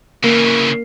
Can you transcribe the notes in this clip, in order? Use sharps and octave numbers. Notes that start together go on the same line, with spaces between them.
C#3 E3 A#3